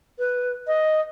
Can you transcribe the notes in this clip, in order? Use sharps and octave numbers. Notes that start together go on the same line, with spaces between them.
B4
D#5